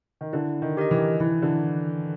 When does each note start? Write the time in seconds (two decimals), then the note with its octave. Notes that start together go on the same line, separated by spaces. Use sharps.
0.21 D#3
0.33 D3 E4
0.62 D#3
0.77 G4 A#4 D#5
0.91 E3
1.20 E3 E4
1.42 D3